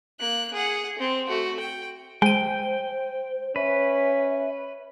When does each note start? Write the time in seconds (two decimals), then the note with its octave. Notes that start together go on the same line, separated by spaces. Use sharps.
0.20 A#3 F#6
0.54 G#4 F#5
0.99 C4
1.28 A3 F#4
1.60 G5
2.22 G#3 C5 G5 D#7
3.56 C#4 B4 E5